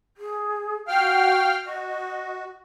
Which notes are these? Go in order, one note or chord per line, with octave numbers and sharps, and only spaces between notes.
G#4
F#4 F5 G5 F6
F#4 D#5